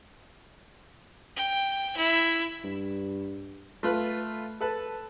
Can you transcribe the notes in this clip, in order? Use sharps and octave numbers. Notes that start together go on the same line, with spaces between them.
G5
E4
G2
A3 F4 B4
A4 B4 A5